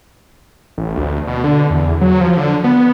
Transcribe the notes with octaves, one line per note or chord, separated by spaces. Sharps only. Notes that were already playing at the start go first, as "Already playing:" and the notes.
A1
D2
B2
D3
E2
F#3
F3
D3
B3